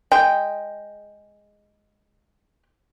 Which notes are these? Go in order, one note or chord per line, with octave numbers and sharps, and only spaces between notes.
G#3 G5